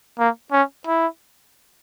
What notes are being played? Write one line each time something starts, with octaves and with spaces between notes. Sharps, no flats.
A#3
C#4
E4